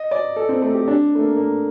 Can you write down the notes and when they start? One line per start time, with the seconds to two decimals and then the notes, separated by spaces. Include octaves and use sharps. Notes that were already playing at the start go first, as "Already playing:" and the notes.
Already playing: D#5
0.11 D5
0.36 A4
0.49 C4
0.62 A3
0.74 G4
0.88 D4
1.15 A3
1.21 A#3
1.37 A#3